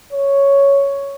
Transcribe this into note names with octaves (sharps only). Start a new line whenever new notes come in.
C#5